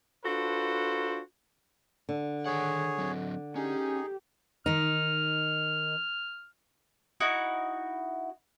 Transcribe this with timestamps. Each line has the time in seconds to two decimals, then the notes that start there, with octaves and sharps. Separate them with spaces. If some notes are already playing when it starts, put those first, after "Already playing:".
0.24 D4 F4 F#4 A4 B4 C5
2.09 D3
2.46 D#3 G#4 C#5 F#5
2.98 F#3 C4
3.56 C#4 D#4 G4 G#4
4.66 D#3 D#4 F6
7.20 D#4 E4 F#4